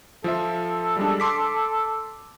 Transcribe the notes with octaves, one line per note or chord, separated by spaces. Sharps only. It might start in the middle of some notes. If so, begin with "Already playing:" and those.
F3 F4 A4 E5
G3 G#3 D4
C6 D6 B6